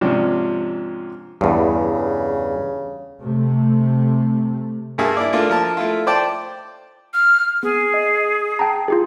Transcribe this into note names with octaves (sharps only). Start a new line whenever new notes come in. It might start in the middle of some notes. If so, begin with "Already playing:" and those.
G#2 C3 F3 C#4 D4
E2 G2 C#3
C3 A3
G2 A#3 G#4 E5 A5
E4 D5
A3 A#3 D4 F4
F3 A#4 A5
A3 E4 F4
C5 D5 G5 A5
F6
B3 G#4
D#5
G5 A5 A#5
F4 G4 G#4